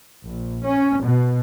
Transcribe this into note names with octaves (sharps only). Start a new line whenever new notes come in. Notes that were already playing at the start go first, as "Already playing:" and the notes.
A#1
C#4
B2